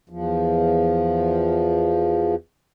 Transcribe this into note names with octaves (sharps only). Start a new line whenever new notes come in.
E2 F3